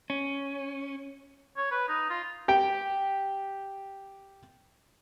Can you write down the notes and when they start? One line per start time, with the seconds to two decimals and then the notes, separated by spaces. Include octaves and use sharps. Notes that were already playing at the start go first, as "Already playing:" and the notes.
0.10 C#4
1.57 C#5
1.71 B4
1.88 D#4
2.10 F4
2.48 G4 G5